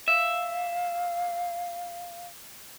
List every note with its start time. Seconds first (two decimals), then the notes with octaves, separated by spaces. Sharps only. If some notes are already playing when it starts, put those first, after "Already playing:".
0.08 E5 F5